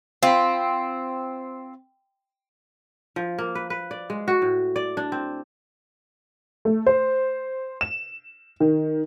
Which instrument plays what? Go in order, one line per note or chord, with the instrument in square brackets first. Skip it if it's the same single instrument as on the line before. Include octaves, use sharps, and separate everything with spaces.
[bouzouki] C4 [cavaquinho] F4 B5
[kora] F3
A#3
B4
B4
D5
G#3
F#4
A2
D5
D4
C4
[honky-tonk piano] A3
C5
E7
D#3